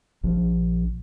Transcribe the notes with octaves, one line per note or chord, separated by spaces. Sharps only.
A#1 F3